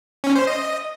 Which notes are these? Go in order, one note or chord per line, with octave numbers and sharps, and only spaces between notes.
C#4
C5
D#5